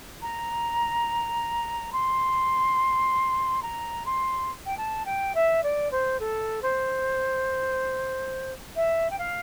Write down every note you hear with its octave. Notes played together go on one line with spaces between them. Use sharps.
A#5
C6
A#5
C6
G5
A5
G5
E5
D5
C5
A4
C5
E5
G5
F5